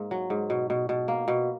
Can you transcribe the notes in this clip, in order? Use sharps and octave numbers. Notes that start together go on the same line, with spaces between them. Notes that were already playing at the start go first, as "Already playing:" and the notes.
Already playing: G#2 A#3
F#3
G#2
B2
B2
B2
A#3
B2